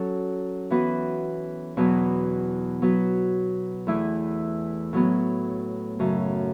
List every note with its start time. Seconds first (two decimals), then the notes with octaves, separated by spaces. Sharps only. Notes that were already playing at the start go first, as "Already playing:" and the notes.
Already playing: F#3 C#4 F#4 A4
0.70 E3 B3 F#4 B4
1.77 E2 B2 F#3 B3
2.82 F#3 B3 F#4 B4
3.87 E2 E3 A3 E4
4.93 A2 F#3 B3
5.99 F#2 C#3 A3